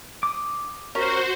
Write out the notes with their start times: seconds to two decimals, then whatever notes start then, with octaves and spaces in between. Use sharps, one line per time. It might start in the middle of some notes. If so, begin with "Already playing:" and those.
0.23 D6 D#6
0.95 C#4 F#4 A#4 C5